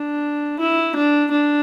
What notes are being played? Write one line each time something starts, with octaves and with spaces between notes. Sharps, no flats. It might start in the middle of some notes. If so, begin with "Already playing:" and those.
Already playing: D4
E4
D4
D4